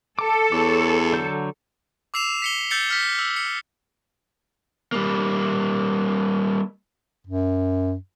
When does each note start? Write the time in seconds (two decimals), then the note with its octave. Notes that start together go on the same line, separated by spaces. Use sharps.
0.19 A4 A5 D6
0.52 E2 C#5 D6
1.13 D3 F#3 G6
2.14 D6 E6 C7 E7 F7
2.42 B6 C#7 G7
2.71 E6 G6 A6 C#7 G7
2.90 F6 B6
3.19 E6
3.36 C#7
4.92 G3 A#3
7.27 F#2